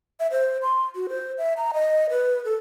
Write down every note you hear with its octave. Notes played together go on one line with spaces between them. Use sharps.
E5
C5
C6
F#4
C5
E5
A#5
D#5
B4
A4